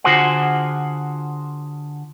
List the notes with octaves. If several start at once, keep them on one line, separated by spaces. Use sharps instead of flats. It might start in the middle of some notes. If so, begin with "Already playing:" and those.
D3 F4 F#4 G#4 C5 F#5